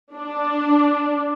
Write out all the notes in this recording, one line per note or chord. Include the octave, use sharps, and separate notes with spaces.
D4